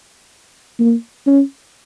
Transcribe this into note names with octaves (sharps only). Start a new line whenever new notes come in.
A#3
C#4